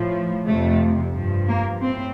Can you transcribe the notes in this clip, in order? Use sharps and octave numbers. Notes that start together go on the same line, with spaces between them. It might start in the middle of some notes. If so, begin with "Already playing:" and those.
Already playing: A2 F3
F2 C3 F3 A3
G2 F3
A#3
A2 C4